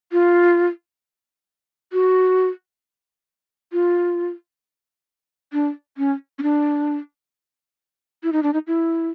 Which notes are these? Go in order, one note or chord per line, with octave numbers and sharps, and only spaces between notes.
F4
F#4
F4
D4
C#4
C#4
D4
E4
D#4
D4
D#4
E4